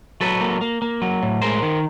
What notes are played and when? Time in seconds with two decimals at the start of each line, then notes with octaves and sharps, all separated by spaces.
0.21 F#3 A4 B4
0.41 A#3
0.61 A#3
0.82 A#3
1.02 F#3
1.23 A2
1.42 G#3 A#4 C5
1.63 D#3